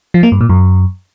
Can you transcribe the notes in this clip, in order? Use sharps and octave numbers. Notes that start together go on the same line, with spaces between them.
F3
A#3
G2
A#2
F#2